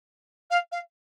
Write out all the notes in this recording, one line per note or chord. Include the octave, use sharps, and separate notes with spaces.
F5
F5